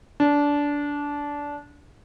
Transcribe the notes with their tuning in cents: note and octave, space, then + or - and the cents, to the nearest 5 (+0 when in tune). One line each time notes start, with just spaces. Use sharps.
D4 -20